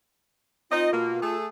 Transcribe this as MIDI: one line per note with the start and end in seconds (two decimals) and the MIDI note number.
0.71 0.89 60
0.71 0.89 63
0.71 1.35 65
0.71 0.89 75
0.92 1.21 47
0.92 1.21 58
1.22 1.48 57
1.22 1.48 68
1.22 1.48 69